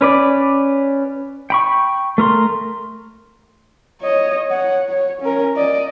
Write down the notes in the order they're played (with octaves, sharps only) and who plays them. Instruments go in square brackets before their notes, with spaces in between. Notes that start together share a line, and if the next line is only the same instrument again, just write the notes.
[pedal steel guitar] C#4 B4 D5
G5 B5 C#6
A3 A#4 C6
[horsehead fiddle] C#5 D#5
C#5 F#5
C#5
C#4 A#4
D5 D#5